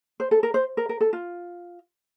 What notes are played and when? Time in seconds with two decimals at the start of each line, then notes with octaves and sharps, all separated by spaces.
0.20 C5
0.31 A4
0.43 A#4
0.54 C5
0.77 A#4
0.89 A#4
1.01 A4
1.13 F4